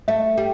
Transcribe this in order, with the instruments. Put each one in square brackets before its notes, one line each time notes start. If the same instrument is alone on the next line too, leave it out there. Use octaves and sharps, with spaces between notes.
[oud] A3 [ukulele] E5
[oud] G3